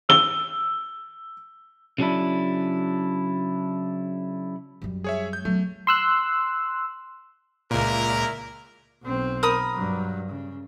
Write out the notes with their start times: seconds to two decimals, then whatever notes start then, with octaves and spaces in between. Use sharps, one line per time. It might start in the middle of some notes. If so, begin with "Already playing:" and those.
0.09 E6 G7
1.98 C#3 F#3 D4 E4
4.82 F#2 G3
5.04 G#4 C#5 E5
5.33 G6
5.45 F#3 A3 B3
5.87 C6 E6 F#6
7.71 C#2 A#2 E4 A#4
9.03 B1 C4
9.43 A#4 B5 D#6
9.73 G2 F#3
10.29 C#3